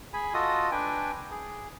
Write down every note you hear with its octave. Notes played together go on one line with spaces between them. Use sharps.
G#4 G#5 B5
F4 F#4 A4 D#5 D#6
D4 B4 G5 G#5
G#4